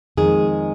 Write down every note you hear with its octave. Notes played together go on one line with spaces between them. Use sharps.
F2 D#3 G#3 G#4